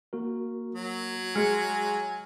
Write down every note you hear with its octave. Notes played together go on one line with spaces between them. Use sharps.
A#3 F#4 A#4
F#3
G#3 G#5 F6 C#7